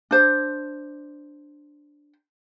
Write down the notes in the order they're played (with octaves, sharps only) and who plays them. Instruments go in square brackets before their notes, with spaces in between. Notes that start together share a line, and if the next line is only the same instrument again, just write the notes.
[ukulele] D4 C5